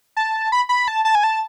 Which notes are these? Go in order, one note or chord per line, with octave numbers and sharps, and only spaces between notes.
A5
B5
B5
A5
A5
G#5
A5